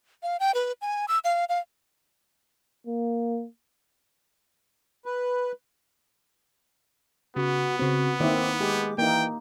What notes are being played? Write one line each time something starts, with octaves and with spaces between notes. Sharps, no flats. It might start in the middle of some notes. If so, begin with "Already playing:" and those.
F5
G5
B4
G#5
E6
F5
F5
A#3
B4
C#3 B3 F#4
C#3 C4 F#4
D#3 A#3 C4 E4 D6
G#3 G4
E3 A#3 D#4 G5